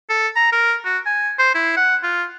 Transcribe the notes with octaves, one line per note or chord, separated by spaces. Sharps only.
A4
A#5
A#4
F#4
G#5
C5
E4
F#5
F4